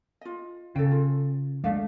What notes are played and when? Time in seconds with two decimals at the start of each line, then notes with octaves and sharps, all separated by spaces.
0.21 F4 D#5
0.76 C#3 A4 G5
0.91 F4
1.64 G#3 A3 D4 F5